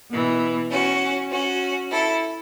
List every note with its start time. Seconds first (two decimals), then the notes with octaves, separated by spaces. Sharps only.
0.11 B2 E3
0.71 C#4 F#4
1.30 C#4 F#4
1.91 E4 A4